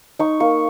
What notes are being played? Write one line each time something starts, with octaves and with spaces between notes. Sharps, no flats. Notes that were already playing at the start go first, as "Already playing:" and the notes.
D#4 C#6
A#3 C#6